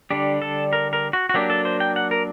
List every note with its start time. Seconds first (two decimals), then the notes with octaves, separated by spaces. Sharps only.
0.11 D3 G3 D4 G4
0.42 A4
0.73 A#4
0.93 A#4
1.13 F#4
1.29 F#4
1.34 F#3 A#3 D4 G4
1.50 A4
1.65 C5
1.80 G5
1.96 F#5
2.11 A#4